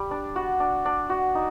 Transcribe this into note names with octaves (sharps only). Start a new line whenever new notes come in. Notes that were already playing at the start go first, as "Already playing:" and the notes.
Already playing: G3
D4
F#4
D4
D4
F#4
D#4